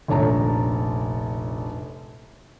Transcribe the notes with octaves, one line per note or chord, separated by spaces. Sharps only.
F1 A#1 C#5 A5 A#5